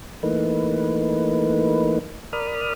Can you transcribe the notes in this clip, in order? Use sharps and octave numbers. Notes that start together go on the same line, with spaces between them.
E3 A3 A#3 D#4 B4
A#4 D5 B5 D#6 F6